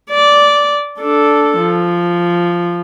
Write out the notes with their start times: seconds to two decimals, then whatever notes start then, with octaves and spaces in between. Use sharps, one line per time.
0.10 D5
0.99 D4 A4
1.58 F3